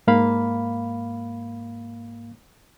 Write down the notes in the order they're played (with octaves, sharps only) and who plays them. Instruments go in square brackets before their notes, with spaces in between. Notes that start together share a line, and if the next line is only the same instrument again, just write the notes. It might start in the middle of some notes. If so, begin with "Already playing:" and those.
[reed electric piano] G#2 A#3 F5 B5